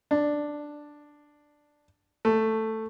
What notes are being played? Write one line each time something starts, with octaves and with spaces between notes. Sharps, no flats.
D4
A3